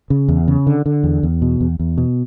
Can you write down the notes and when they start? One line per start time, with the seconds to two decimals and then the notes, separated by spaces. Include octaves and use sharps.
0.10 C#3
0.28 E2
0.48 C#3
0.67 D3
0.86 D3
1.03 E2
1.23 E2
1.42 B2
1.61 E2
1.79 E2
1.98 B2